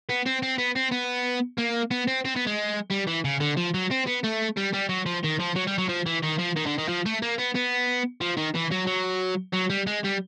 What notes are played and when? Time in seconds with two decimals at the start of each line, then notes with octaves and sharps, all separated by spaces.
0.09 B3
0.26 C4
0.43 C4
0.58 B3
0.76 C4
0.92 B3
1.58 A#3
1.91 B3
2.08 C4
2.25 C4
2.36 B3
2.47 G#3
2.91 G3
3.07 E3
3.25 C#3
3.40 D3
3.57 F3
3.74 F#3
3.91 C4
4.07 B3
4.24 A3
4.57 G3
4.74 G3
4.89 F#3
5.06 F3
5.24 D#3
5.39 F3
5.55 F#3
5.67 G3
5.78 F#3
5.89 F3
6.06 E3
6.23 D#3
6.38 F3
6.56 D#3
6.66 D3
6.78 D#3
6.88 F3
7.06 A3
7.22 A#3
7.39 B3
7.55 B3
8.21 F3
8.37 D#3
8.55 E3
8.71 F#3
8.87 F#3
9.53 F#3
9.70 G3
9.87 G#3
10.04 G3